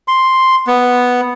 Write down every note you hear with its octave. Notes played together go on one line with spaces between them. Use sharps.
C6
B3